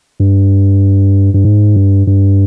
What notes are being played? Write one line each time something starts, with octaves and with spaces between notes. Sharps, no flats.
G2
G2
G#2
G2
G2